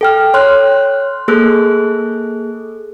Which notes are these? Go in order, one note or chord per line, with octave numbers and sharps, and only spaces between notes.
A4 G5 F6
C#5 C6 F6 F#6
A#3 G#4 A4 E6 F#6